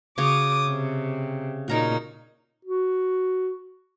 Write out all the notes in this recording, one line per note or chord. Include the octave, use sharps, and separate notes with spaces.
C#3 F#4 C#5 D6 D#6
C3
A#2 D#4 F#4 A#4 C#5
F#4